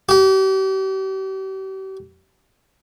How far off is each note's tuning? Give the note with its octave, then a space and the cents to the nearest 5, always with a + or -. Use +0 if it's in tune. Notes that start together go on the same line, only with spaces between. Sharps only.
G4 -40